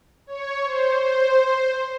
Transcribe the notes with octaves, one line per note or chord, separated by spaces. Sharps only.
C#5
C5
C5